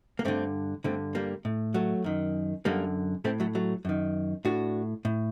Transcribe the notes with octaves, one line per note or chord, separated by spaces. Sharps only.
A#3
G2 D3 A3 C4
G2 D3 A3 C4
G3 A#3
A2
F#3 A3
F#2 D#3
F#2 D3 G3 A#3
A2 A3 C4
F#3 A3
F#3 A3
F#2 D#3
A2 D4 F#4
A2